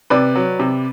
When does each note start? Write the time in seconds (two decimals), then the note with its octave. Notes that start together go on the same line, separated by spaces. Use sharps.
0.10 C3 B4 D5
0.35 F#3
0.60 C3